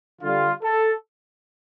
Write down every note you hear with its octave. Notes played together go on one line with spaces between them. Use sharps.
D3 G3 F4
A4